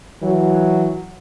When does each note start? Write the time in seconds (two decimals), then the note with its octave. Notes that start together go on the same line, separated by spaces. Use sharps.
0.23 E3 F#3